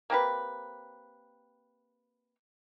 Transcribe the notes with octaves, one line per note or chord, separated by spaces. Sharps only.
A#3 C4 G4 B4